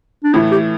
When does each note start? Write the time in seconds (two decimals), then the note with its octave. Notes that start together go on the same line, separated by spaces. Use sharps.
0.24 D4
0.33 A2 E3 A3 E4
0.52 G4